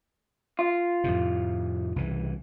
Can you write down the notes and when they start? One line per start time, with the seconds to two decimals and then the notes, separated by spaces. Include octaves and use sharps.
0.59 F4
1.04 F2 A2 C3
1.96 C2 C#3 E3